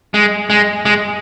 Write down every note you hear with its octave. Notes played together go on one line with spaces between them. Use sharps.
G#3
G#3
G#3